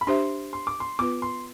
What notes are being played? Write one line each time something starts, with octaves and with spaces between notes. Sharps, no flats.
B5
D4 G4 C5 E5 C6
C6
D6
C6
B3 F4 B4 D6
C6